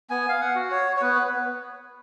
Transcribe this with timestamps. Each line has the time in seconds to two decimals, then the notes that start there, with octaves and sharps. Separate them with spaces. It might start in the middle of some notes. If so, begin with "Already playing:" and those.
0.10 B3 G#5
0.29 F5
0.41 F#5
0.56 F#4
0.71 C#5
0.97 C#5
1.02 B3 B4